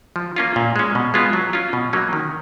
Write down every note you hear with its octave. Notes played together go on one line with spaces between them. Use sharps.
F3
A#3 C#4 F4
A#2
G#3 C#4
B2
G#3 B3 F4
F#3
C#4 F4
B2
F#3 A#3 C#4
D#3